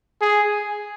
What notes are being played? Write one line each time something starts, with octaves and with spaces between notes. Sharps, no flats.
G#4